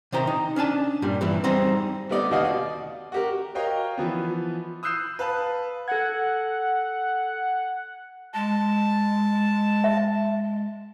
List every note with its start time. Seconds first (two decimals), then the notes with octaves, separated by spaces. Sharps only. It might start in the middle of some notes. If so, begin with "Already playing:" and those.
0.12 C3 D#3 C5 G5 A#5
0.27 D#4
0.56 C#4 D4 G#5 A5
1.02 G2 A#2 G3
1.21 G2 E3 E4
1.44 G3 C4 D#4 G#4 C5
2.09 G3 A3 B3 D#4 D5 D#5
2.31 D#2 B2 F#4 D#5 F5 D#6
2.45 D5
3.12 F#4 G4 A#4
3.55 F#4 A#4 C#5 D#5 F5 G5
3.98 E3 F3 B3
4.83 D#6 E6 F#6 G6 C7 E7
5.19 B4 F5 A5
5.88 A4 F#5 G#6
8.34 G#3 A5
9.84 E5